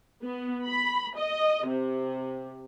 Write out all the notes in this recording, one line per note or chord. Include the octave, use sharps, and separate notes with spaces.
B3
B5
D#5
C3